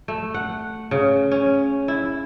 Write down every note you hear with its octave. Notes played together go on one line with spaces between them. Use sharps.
A3
F#5
C#3
C#4
E4